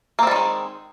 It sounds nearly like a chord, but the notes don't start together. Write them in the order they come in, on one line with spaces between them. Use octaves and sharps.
A#3 C4 G3 D#3 G#3